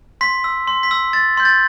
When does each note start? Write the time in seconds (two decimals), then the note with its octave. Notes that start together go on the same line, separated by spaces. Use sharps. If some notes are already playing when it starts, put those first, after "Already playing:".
0.21 C6 B6
0.44 E6
0.68 C6
0.83 B6
0.91 E6
1.13 C6 A6
1.37 C6 G6
1.45 A6